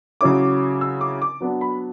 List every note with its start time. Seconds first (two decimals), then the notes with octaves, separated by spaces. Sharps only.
0.21 C#3 F#3 C#4 E4 D6
0.81 E6
1.01 D6
1.22 D6
1.41 F#3 B3 D4
1.61 B5